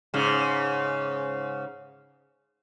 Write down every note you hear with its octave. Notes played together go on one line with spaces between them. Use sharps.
G#2 C#3